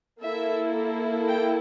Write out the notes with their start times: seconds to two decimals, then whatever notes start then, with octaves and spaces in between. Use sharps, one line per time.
0.23 A#3 E4 A4 E5
1.28 G5